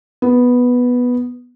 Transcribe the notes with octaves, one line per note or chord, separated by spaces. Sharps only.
B3